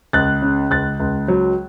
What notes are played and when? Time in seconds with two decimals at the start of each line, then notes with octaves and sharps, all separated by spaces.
0.13 C#2 F#6 A6
0.42 C#3
0.70 C#2 F#6 A6
1.00 C#2
1.28 F#3